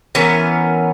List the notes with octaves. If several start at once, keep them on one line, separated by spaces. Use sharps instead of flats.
E3 B3 C#4 A#4